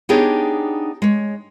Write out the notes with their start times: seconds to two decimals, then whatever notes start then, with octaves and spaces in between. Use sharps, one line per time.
0.09 B3 D4 D#4 G4 G#4 C#5
1.02 G#3 C#5